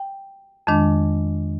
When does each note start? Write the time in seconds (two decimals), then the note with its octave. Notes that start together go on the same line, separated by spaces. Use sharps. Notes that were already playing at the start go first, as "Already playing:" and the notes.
Already playing: G5
0.67 F2 D#3 G#3 D4